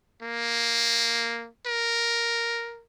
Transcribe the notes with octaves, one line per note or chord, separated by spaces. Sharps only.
A#3
A#4